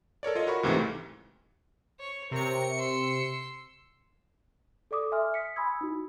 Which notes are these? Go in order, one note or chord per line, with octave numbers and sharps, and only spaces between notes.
A4 A#4 C#5 D5
F4 C#5 D#5
F#4 A#4 B5 C#6
C#2 G#2 C3 E3 A3
C#5
C3 A#4 C#5 C#7
C6 E6
A4 D5 D6 D#6
E5 G#5 C6 F6
D#6 B6 C#7
G#5 B5 C6 D#6 E6 G#6
D#4 E4 F#4